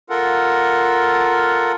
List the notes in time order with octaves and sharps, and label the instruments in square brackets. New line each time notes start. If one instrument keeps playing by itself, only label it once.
[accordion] F4 A4 A#4 F#5